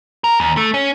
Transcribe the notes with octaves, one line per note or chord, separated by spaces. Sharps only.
A#4
D#2
A3
C#4